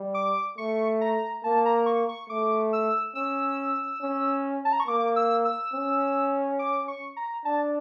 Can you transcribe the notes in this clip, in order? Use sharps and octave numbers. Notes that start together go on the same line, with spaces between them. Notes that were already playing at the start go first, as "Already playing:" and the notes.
Already playing: G3
D6
A3 C#6
A#5
A#3 A5
A#5
C#6
C#6
A3 D6
E6
C#4 E6
C#4
A5
A#5
C#6
A#3 D6
E6
E6
C#4
D6
C#6
A#5
D4 A5